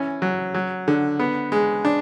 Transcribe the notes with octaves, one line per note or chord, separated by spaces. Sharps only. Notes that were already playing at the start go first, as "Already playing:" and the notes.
Already playing: E3 C#4
F#3
F#3
D3
B3
G#3
D4